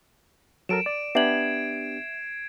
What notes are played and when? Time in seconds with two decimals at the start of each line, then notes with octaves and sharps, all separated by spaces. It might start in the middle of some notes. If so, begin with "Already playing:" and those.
0.69 F#3 A4 A#4 D7 E7
0.86 D5
1.15 B3 D4 G4 E5 G#6 C7 F#7